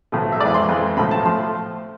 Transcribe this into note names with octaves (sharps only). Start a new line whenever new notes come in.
B1 A2 F3 A3
E5
F2 E3 G#3 D5
C6
F2 E3 G#3
B1 A2 F3 A3 B5
A5
A2 F3 A3 C6